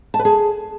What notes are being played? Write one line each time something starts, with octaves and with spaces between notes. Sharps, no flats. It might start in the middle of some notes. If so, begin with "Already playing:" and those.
A5
B4
G#4